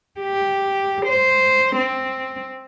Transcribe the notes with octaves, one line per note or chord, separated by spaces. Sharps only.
G4
C5
C4